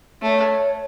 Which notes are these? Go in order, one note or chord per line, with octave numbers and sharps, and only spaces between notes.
A3 C#5